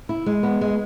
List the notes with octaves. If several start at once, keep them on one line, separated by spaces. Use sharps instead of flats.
E4
G#3
B3
G#3